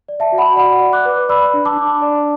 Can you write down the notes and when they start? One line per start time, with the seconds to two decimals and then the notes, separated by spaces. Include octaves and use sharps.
0.08 D5
0.20 E5 A5
0.32 F#4
0.38 F#5 B5
0.56 D5 F#5 B5
0.81 D5
0.93 D6 F#6
1.05 B4
1.29 D5 B5 E6
1.54 D4
1.65 A5 D6
1.78 D4
2.02 D5